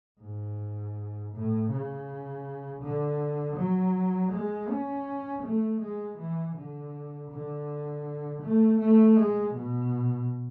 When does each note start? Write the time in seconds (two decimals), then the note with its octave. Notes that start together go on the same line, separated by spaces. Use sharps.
0.20 G#2
1.33 A2
1.70 C#3
2.82 D3
3.57 F#3
4.32 G#3
4.68 C#4
5.43 A3
5.80 G#3
6.18 E3
6.56 D3
7.30 D3
8.42 A3
8.80 A3
9.16 G#3
9.54 B2